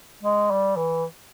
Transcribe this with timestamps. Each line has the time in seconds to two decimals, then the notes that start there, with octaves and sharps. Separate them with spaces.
0.23 G#3
0.51 G3
0.76 E3